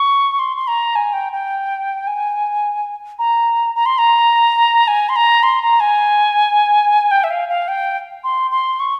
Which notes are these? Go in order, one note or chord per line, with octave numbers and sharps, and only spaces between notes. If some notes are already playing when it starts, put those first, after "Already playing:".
Already playing: C#6
C6
C6
A#5
G#5
G5
G5
G#5
A#5
A#5
C6
A#5
G#5
C6
A#5
C6
A#5
G#5
G5
E5
F5
F5
G5
C6
C6
C#6